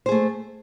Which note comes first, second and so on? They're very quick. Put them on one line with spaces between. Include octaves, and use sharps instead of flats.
C5 G#4 A3